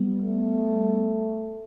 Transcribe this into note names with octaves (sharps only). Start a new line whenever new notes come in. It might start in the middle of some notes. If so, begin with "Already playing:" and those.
Already playing: G3 B3
A3